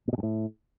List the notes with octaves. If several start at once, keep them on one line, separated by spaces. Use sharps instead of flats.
A#2
B2
G2
A2